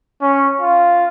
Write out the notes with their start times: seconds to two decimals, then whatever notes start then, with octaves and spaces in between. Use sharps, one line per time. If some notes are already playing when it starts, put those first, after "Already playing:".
0.21 C#4
0.61 F4